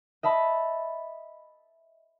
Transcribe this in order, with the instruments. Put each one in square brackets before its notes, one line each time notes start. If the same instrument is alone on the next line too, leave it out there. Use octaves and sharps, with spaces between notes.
[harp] D#5 E5 A5 B5